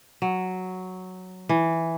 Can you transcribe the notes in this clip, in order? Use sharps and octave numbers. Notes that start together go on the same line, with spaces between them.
F#3
E3